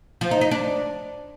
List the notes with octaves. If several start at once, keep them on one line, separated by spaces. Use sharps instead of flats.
F3
D#4
D#4
D4